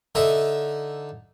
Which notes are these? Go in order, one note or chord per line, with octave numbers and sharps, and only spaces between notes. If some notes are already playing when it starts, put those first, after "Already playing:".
D3 D#4 E5